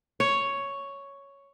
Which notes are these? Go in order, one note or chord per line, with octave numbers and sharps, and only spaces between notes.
C#5